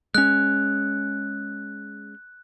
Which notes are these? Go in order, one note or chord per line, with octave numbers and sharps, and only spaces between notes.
G#3 C#4 F#6